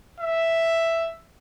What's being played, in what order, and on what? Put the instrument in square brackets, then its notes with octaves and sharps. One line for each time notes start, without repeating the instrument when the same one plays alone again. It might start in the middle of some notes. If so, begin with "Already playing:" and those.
[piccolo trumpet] E5